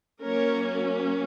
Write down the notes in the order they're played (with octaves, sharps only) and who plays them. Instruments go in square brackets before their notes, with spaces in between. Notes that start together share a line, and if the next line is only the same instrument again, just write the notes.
[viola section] F#3 A#3 C#4 A#4 C#5